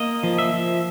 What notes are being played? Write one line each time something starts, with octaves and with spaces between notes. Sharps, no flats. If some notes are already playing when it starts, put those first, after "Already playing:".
Already playing: A#3 D#5
F3
E5
F3